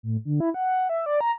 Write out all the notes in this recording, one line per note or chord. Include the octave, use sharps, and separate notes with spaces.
A2
D3
E4
F#5
E5
D5
A#5